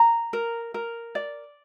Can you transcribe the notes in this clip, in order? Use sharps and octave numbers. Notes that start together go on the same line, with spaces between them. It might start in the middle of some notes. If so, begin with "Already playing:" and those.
Already playing: A#5
A#4
A#4
D5